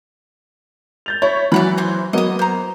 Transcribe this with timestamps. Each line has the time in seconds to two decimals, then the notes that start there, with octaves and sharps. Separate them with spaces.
1.06 G6 A6 F7
1.22 E4 C#5
1.52 E3 F#3 D5 F#5 B5
1.78 C5 G#5 C6
2.13 F#3 A#3 B3 D#5 D#6
2.39 C5 A#5